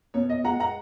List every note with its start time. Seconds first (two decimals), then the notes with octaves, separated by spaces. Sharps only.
0.14 B2 C#5
0.29 D#5
0.44 G#3 F#5 A#5
0.60 F#5 A#5